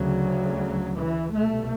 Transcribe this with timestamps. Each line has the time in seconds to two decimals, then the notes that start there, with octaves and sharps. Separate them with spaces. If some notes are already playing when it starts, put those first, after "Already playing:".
Already playing: D2 C#3 F#3
0.98 E3
1.34 C2 B2 A3